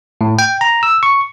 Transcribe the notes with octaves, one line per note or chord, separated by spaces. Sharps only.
A2
G5
A#5
E6
C#6